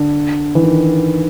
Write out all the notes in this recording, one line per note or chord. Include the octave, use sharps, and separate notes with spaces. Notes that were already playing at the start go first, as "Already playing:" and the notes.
Already playing: D3
E3
D#3